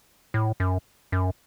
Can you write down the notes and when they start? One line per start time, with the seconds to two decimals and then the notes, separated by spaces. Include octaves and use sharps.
0.34 A2
0.60 F#2
1.12 F#2